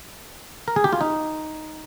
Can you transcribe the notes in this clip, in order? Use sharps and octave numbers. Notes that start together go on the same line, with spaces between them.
A#4
G#4
G4
F4
D#4